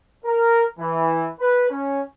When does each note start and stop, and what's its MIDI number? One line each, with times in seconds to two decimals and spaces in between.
0.25 0.65 70
0.79 1.29 52
1.40 1.69 71
1.70 2.02 61